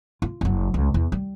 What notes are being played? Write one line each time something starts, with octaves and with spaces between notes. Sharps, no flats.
F4
F#1 F#3
C#2
E2
G3